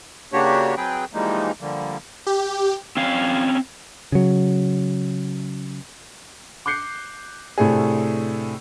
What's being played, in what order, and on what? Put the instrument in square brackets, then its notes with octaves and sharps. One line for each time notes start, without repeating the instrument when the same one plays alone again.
[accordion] C#3 A#3 D4 F#4 G4 C#5
F#3 C4 G#4 B4 G5
E3 F3 G3 G#3 A#3 D#4
D3 F3 G3 A#3
[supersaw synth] G4
[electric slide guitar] C4 C#4 F5
[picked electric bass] C#3 F#3
[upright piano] D6 F#6 G6 C7 C#7
A2 C3 A3 D4 G#4